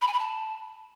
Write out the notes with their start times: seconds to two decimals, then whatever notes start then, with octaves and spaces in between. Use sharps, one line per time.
0.01 B5
0.07 G#5
0.13 B5
0.19 A5